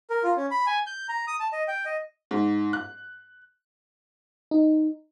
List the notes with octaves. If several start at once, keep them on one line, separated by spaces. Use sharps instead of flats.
A#4
F4
C#4
B5
G#5
G6
A#5
D#6
A5
D#5
G5
D#5
G#2
F#6
D#4